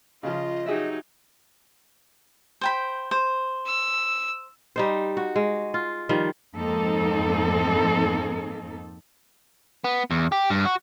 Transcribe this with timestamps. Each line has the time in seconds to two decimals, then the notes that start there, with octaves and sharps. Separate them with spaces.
0.23 C#3 F3 F4 D#5
0.66 F#3 D#4 G4 G#4 E5
2.61 C5 G5 B5
3.11 C5
3.67 E6
4.76 G3 D#4 C5
5.17 F#4
5.36 G#3
5.74 F4
6.09 D#3 F3 G3
6.56 F2 G#2 A#3 C4 D#4 A4
9.84 B3
10.11 E2
10.32 G4
10.50 G2
10.66 F#4